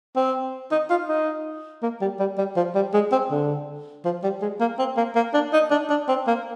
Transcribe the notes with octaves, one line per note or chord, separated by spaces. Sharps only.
C4
D#4
F4
D#4
A#3
G3
G3
G3
F3
G3
G#3
C4
D3
F3
G3
G#3
A#3
C4
A#3
A#3
D4
D#4
D4
D4
C4
A#3